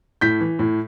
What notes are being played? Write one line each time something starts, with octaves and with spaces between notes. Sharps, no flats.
A2 G6 B6
E3
A2